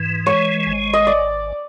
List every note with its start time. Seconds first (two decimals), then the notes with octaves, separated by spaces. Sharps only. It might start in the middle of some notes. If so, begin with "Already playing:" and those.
Already playing: G#2 E3
0.26 G#3 C#5
0.67 G#1
0.93 D#5
1.07 D5